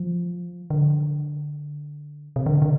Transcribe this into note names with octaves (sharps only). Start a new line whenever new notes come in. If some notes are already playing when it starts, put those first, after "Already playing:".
Already playing: F3
D3
C3
D3
D3